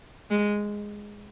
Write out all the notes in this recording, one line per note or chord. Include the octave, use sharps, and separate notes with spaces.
G#3